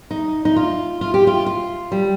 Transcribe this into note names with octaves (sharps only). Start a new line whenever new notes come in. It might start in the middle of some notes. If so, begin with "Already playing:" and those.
D#4
D#4
F4
F4
G4
F4
F4
G3